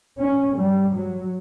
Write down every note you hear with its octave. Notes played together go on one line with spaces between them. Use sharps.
C#4
G2 G3
F#3